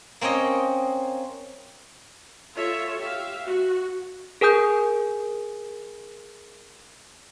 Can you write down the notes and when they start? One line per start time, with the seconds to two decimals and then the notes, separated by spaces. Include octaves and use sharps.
0.21 A#3 C4 C#4 C#5 D#5
2.56 F4 A4 C#5 E5
2.99 G4 E5 F5
3.46 F#4
4.41 G#4 A#4 G#5 D#6 G6